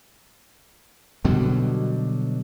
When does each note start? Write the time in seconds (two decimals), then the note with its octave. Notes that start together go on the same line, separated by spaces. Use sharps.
1.25 B2 D3 F#3 G3